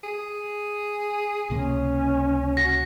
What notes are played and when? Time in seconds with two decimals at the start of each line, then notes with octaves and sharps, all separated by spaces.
0.03 G#4
1.50 C#2 C3 A#3 C#4
2.57 F#4 A#6